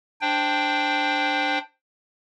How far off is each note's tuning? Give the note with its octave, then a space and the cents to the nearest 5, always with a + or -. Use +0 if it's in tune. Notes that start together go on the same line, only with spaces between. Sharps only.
D4 +0 C5 +5 G5 +0